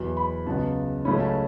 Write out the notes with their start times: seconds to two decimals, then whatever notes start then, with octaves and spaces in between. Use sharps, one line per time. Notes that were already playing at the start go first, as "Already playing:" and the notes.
Already playing: E2 B2 F#3
0.17 B5
0.46 C#2 C#3 F#3 B3 A5
1.05 C#2 C#3 F#3 A3 C#4 B5
1.20 A5